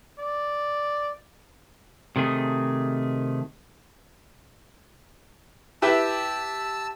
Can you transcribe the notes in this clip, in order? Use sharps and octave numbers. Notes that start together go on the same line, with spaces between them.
D5
C3 D#3 A3 G#4
E4 G4 B4 A5 E6